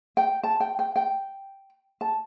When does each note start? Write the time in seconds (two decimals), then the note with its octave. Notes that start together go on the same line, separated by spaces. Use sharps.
0.17 G5
0.43 A5
0.60 G5
0.79 G5
0.96 G5
2.01 A5